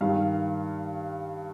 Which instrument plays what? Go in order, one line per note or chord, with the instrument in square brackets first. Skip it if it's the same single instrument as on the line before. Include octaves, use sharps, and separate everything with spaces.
[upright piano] G2 D#3 F5